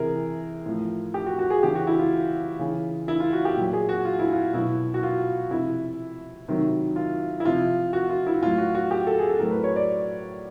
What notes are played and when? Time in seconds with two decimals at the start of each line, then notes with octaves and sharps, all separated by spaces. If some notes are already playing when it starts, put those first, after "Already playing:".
Already playing: C3 E3 G#4 A#4
0.66 A2 F3
1.14 G4
1.26 F#4
1.39 F#4
1.50 G#4
1.63 C#3 E3 G4
1.75 F#4
1.87 E4
1.99 F4
2.59 C#3 E3
3.08 E4
3.20 F4
3.33 F#4
3.45 G4
3.57 A#2 F#3
3.73 G#4
3.89 F#4
4.05 F4
4.19 E4
4.33 F4
4.54 B2 F#3 E4
4.94 F#4
5.03 F4
5.51 C3 F3 E4
6.48 C3 D#3 F#3
6.96 F4
7.40 E4
7.45 C3 F3 F4
7.93 F#4
8.10 F4
8.27 E4
8.42 A2 F#3 F4
8.58 F#4
8.75 F#4
8.91 G4
9.07 A4
9.19 G#4
9.29 A4
9.39 A2 F#3 A#4
9.51 B4
9.64 C#5
9.76 D5